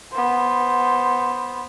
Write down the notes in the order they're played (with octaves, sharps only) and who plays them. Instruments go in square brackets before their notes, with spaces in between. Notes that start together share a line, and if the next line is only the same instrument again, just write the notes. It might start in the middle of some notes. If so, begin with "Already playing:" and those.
[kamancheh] B3 C5